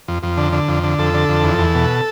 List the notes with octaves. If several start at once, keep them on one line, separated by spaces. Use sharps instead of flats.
F2
F2
D3
D3
F2
D3
F2 A4
D3
F2
E2
E2
B2